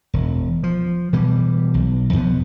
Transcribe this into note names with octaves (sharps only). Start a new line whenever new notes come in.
E1
F3
B2 E3 G3
B1
F2 B2 F3 B3